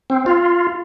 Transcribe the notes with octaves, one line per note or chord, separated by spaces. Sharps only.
C4
F4